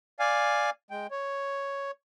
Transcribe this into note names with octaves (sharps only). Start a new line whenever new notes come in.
D5 F5 G#5
G#3 G5
C#5